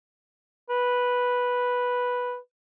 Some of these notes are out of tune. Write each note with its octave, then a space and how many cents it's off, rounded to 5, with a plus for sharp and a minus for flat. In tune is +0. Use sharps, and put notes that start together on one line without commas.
B4 -5